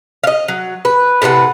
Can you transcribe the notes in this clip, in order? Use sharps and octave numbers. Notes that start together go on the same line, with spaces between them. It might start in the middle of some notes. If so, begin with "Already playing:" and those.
D#5 F5
F#3
B4
A2 C3 B4 F#5